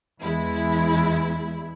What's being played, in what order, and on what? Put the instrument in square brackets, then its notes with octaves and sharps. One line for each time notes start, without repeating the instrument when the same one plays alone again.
[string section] E2 E3 G#3 E4